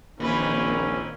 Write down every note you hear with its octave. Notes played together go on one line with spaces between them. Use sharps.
A#1 F2 D#3 E3 A#3 C4 C#4 B4